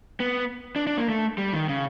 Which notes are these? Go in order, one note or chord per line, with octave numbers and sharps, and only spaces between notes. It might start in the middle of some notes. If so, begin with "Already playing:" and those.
B3
D4
D4
A#3
A3
G3
D#3
C#3